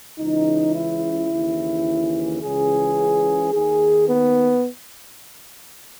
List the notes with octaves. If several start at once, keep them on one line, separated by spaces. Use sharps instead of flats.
C#2 C#3 E3 D#4
E4
D#2 C#3 E3
C#2 C#3 E3 G#4
D#2 D#3 G#4
B3